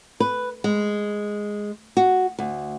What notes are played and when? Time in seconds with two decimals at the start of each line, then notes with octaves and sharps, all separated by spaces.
0.20 B4
0.64 G#3
1.97 F#4
2.39 D2